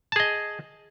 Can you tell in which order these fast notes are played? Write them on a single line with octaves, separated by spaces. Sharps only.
A5 G#4 D#5